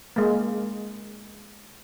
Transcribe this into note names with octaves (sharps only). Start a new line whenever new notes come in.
G#3 A#3